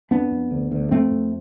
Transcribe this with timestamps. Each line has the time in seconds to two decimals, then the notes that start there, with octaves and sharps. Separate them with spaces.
0.11 F2 B3 D4
0.31 F2
0.51 D2
0.72 D2
0.91 F2 A3 C4
1.11 F2